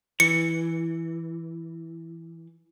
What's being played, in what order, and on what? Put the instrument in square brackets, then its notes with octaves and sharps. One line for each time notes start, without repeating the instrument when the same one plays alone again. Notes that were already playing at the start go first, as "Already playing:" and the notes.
[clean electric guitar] E3 [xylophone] C#7